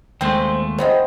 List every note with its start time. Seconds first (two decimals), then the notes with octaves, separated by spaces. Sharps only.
0.21 D#2 G#3 A3 C4 C5
0.78 C#3 B3 C4 C5 D#5